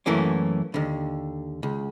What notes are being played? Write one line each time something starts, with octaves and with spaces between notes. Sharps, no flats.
F#2 E3 A3 A#3 C#4
D#2 D3
C#2